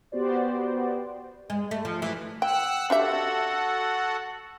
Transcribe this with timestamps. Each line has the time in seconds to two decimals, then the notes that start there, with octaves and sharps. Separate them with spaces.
0.12 B3 F#4 G4 C5 D5
1.50 G#3
1.71 A3
1.85 F3
2.02 E3
2.42 F#5 G5 E6 F#6
2.90 D4 F#4 G4 A4 E5 F#5